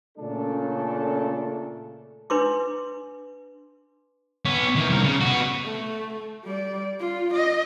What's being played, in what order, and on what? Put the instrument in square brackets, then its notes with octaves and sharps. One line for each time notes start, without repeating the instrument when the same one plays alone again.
[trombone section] A#2 C#3 A3 C#4 D4 A4
[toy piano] D4 B4 C6 D6
[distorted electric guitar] B3 C#5
D#3 E3
C2 A#4
C#3
B3 F#4
[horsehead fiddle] A3
G3 D5
F4
D#5